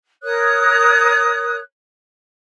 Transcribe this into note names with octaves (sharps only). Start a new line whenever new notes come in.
A#4 C#5 D#6 F#6